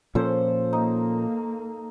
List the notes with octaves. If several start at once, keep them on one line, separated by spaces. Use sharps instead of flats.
A#2 F3 C#4 A4 C5
A#3 D#4